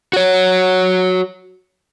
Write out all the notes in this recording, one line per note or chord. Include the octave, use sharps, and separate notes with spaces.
F#4 C#5